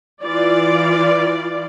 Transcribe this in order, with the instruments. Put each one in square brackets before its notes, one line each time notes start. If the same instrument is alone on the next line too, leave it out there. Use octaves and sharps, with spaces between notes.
[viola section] E3 F4 D5